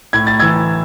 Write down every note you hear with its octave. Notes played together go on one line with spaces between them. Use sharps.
A2 G#6
A6
E3 E6 G#6